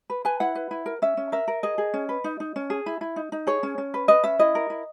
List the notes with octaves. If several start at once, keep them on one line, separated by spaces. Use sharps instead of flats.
B4
B4 G#5
E4 F#5
B4
E4
A#4
C#4 E5
C#4
A#4 E5
A#4
G#4 D#5
G#4
C#4
B4
D#4
D#4
C#4
G#4
E4
E4
D#4
D#4
G#4 C#5
C#4
C#4
B4
B4 D#5
C#4 E5
E4 D#5
A#4
E4